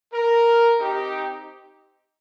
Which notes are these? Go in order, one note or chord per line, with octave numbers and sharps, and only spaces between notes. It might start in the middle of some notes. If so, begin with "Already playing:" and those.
A#4
C4 D#4 G4